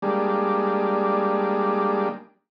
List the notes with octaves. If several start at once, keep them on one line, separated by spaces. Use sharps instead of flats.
G3 G#3 A#3 D4